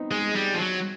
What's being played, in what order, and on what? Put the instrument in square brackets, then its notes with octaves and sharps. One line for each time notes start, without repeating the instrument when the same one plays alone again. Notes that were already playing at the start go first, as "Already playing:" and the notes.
Already playing: [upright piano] B3 C4 D#4
[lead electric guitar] G#3 [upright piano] G#4
[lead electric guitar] G3
F3
F#3